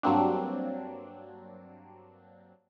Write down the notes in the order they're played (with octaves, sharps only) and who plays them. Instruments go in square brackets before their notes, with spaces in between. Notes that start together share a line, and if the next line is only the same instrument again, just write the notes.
[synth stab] G2 F#3 A#3 C4 D4